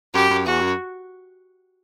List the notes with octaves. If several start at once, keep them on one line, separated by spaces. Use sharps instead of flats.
F#2 G4
F#2
E2 F#4
F#2